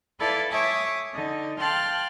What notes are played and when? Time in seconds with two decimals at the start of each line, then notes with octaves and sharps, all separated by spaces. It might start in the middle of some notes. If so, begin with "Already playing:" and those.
0.19 E4 A4 B4 D5 F5
0.50 C#5 E5 G#5 D6 D#6
1.14 D3 D#4
1.59 F5 G5 A5 C6 F6 F#6